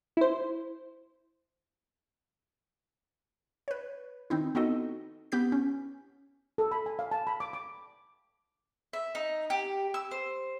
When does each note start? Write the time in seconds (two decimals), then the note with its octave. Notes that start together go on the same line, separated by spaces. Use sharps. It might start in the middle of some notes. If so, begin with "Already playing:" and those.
0.17 E4 C5
3.68 B4 C#5
4.30 D#3 C4 D#4 E4
4.55 B3 C4 D#4 F#4 A4 D#5
5.32 B3 G4 G6 B6
5.52 C#4
6.58 A4
6.72 B5
6.86 G#5
6.99 F5
7.11 A5
7.27 B5
7.40 D6
7.53 D6
8.93 E5
9.15 D#4
9.50 G4
9.94 E6
10.11 C5